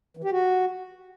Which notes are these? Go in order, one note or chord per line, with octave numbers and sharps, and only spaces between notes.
E3
G4
F#4